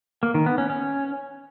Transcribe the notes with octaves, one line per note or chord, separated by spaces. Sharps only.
A#3
D#3
B3
C#4
C#4